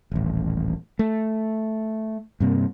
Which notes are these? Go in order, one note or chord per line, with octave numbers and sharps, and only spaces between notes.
D#1 A1
A3
G2 C3 A#3